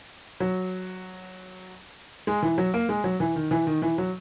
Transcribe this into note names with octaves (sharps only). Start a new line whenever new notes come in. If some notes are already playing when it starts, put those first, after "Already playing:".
F#3
G#3
E3
F#3
A#3
G#3
F#3
E3
D#3
E3
D#3
E3
F#3